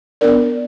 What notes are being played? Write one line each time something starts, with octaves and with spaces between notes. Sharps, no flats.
B3 D4 A#4 D5